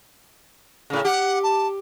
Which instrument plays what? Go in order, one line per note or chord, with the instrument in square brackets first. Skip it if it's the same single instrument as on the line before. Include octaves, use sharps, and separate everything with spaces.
[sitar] A2 C#3
[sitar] G4 [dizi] F#5
[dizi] A5